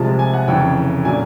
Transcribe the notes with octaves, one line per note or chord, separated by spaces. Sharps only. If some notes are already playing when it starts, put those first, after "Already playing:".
Already playing: C2 C3 F3 G#3 A5
G#5
F#5
F1 F2 C#3 E3 G5
A#2 F#3 A#3 D4 G#5